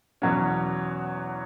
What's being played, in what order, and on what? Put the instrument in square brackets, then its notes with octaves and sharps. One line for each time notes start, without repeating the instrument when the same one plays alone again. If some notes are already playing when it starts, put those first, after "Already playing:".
[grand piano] E2 B2 F#3 C#4